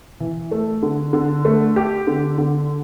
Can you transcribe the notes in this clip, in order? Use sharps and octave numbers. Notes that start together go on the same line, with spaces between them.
E3
A3
D3
D3
A3
G4
D3
D3